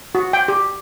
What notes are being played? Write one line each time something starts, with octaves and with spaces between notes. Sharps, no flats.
F#4
G5
G4